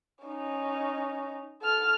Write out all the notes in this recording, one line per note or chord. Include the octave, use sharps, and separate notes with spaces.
C#4 D#4
A4 F6